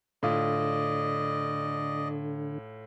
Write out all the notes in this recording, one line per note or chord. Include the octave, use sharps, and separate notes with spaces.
A2 D3 F4 D5 D#5